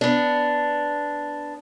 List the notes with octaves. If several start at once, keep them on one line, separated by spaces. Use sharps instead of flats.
B3 D4